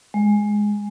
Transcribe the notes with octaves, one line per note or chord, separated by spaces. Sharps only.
G#3